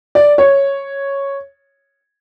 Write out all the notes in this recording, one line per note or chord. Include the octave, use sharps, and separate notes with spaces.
D5
C#5